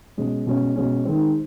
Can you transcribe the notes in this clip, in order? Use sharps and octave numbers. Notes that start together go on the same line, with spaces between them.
B2 G#3 C#4
B2 G#3 C#4
B2 G#3 C#4
D#3 G#3 C4